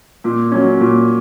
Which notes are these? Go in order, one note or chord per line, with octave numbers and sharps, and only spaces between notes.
A#2
F#3 C#4
A#2